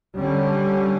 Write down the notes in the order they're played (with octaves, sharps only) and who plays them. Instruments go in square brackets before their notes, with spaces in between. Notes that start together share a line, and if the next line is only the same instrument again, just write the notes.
[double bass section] D3 G3 C#4